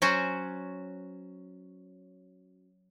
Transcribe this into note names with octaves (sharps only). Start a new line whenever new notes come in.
F#3 C#4 F#4 C5